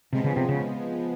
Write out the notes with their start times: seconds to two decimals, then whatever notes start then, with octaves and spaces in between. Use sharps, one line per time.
0.12 C3 F3 G#3 B3
0.24 C#3
0.36 C3
0.49 C#3